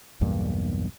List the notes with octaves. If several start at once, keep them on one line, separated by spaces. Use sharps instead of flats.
B1 E2 G2 A#3